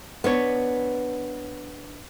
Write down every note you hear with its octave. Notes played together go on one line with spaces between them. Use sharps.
B3 D4 C#5